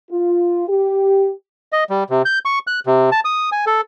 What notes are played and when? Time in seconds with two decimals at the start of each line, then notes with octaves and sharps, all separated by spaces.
0.10 F4
0.68 G4
1.73 D#5
1.90 G3
2.10 C3
2.25 G6
2.45 C#6
2.67 F#6
2.86 C3
3.12 A5
3.25 D#6
3.52 G#5
3.67 A4